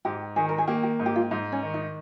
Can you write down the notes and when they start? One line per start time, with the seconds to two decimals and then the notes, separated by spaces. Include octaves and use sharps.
0.05 G#2 G4
0.36 D#3 G#4
0.49 A#4
0.58 G#4
0.67 A#3 G4
0.83 G4
0.99 G#2
1.06 G4
1.16 F4
1.31 G#2 D#4
1.52 C#4
1.63 D#3
1.74 D#4